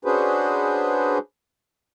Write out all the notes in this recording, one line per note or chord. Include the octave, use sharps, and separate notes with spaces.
C#4 D4 F#4 G#4 B4 C5